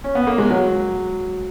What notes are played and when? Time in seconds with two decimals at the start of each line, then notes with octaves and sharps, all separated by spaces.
0.04 C#4
0.15 B3
0.27 A#3
0.38 G#3
0.50 F#3